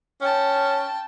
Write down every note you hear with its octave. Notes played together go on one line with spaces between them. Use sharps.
C#4 G5 A5